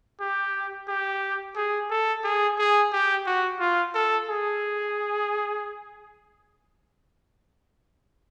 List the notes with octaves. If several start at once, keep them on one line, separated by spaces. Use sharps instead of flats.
G4
G4
G#4
A4
G#4
G#4
G4
F#4
F4
A4
G#4